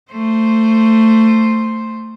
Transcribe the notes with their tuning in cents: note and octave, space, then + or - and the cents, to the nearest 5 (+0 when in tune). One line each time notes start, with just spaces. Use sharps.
A3 +20 C5 +0